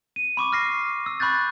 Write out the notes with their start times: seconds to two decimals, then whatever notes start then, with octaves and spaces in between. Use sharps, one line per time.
0.16 D#7
0.37 B5 C#6 D6
0.52 F6 A#6 C7
1.06 E6
1.20 B5 C#6 F#6 G6 A6